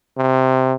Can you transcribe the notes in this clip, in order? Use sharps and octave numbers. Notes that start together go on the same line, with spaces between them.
C3